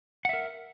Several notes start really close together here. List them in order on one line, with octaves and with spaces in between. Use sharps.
F#5 E5 A#4